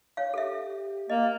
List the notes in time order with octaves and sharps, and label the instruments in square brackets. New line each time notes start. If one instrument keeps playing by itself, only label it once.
[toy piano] C#5 F5
[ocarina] G4 [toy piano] A4 E5
[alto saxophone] A#3 [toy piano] D#5